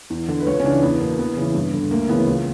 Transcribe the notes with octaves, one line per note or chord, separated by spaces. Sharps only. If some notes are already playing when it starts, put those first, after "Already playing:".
E2
D3
B4
C#2 C#5
C#4
C#3 E3 D4
E2 B3
B2 A#3
E2 B3
C#3 E3
G2
D3
D2 A#3
C#3 E3 B3
C#2